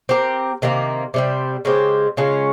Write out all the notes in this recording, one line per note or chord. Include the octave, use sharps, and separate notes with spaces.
C4 G4 A#4
C3 D#3 A#3
C3 G3 C4
C#3 G#3 C4 G4
C#3 G#3 C#4 F4